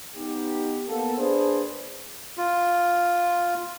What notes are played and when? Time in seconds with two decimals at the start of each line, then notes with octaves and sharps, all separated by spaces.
0.15 B3 D#4 G4
0.88 A#3 B3 A4
1.18 A#3 D4 G#4 B4 C5
2.37 F4